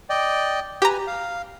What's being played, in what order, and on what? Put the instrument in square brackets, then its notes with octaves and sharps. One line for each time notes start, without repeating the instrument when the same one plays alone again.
[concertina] D5 D#5 G5
[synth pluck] G4 A#5 [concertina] B4 G#5
[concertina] F5